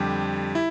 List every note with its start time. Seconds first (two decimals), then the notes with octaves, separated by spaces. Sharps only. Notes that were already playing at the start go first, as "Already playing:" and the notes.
Already playing: F2 D3 G3 G4
0.55 E4